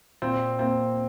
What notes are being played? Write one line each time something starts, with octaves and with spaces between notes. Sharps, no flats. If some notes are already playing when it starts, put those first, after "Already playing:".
A#2 C4
A#3 C4